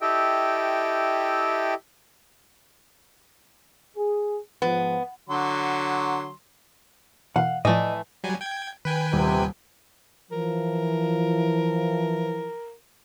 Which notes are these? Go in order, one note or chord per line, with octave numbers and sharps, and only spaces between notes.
E4 G4 A4 D#5 E5 G5
G#4
G#2 F3 B3
D3 F#3 C6
B2 E3 A#3 F5 F#5
A2 E3 F3 A3 D5 D#5
F#3 G3 G#5
G5 G#6
D#3 B4 G5 G#5
D#1 C3
E3 F3 A#4